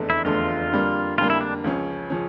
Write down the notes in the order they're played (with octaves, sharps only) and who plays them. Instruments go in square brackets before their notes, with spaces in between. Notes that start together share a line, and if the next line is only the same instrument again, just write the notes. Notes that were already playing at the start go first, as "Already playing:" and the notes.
Already playing: [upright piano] F1 E2 D3 A3 D4
[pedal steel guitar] E4
[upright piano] F1 E2 D3 A3 D4 [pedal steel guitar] F4
[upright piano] F2 D3 G3 A#3
[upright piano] F2 D3 G3 A#3 [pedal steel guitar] F4
[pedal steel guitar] E4
D4
[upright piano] C#2 C#3 F3 C#4
C#3 F3 C#4